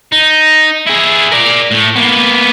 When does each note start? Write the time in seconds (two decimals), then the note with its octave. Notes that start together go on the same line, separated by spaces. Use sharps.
0.12 D#4
0.86 E4 G#4
1.31 A#4 D5
1.71 A2 A3
1.96 A#3 B3